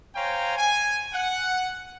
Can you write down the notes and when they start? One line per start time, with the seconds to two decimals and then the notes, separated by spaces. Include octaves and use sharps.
0.15 C5 C#5 F5 G5 G#5 A#5
0.57 G#5
1.13 F#5